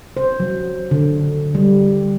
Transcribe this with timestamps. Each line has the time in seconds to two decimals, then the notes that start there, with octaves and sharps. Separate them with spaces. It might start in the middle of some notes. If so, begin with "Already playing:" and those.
0.17 C5
0.40 F#3
0.91 D3
1.55 G3